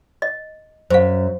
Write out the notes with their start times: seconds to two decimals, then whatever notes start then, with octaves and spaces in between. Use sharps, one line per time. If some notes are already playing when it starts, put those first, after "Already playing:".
0.22 D#5
0.90 F#2 C5 F5